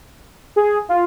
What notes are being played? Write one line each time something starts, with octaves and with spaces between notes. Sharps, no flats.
G#4
F4